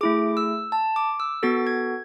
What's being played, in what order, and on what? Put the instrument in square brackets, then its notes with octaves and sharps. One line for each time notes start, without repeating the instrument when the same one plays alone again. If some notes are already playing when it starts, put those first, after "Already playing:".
[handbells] A3 E4 G#4 D6
E6
A5
D6
E6
B3 F#4 A4 A6
G#6